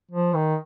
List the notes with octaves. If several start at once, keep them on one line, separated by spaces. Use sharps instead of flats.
F3
D#3